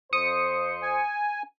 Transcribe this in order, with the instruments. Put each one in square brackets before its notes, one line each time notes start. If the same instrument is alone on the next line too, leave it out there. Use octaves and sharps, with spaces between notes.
[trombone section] F2 C5 [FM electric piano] D#6 C#7
[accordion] G#5